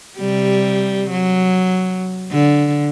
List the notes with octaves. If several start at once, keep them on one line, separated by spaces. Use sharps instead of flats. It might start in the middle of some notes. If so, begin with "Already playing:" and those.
C3 G3
F#3
D3